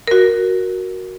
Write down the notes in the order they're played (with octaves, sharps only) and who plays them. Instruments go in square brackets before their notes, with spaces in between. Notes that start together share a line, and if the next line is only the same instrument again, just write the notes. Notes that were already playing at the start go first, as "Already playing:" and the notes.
[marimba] F#4 A#4